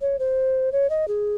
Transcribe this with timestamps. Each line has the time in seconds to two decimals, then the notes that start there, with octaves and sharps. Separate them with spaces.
0.01 C#5
0.19 C5
0.72 C#5
0.90 D#5
1.08 G#4